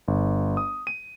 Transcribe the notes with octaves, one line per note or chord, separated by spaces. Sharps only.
G1
D#6
D#7